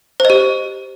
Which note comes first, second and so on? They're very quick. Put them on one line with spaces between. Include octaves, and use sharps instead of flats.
C5 D#5 G4